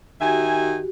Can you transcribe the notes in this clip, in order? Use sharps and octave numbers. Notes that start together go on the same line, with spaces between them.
D#3 F#4 G4 E5 G#5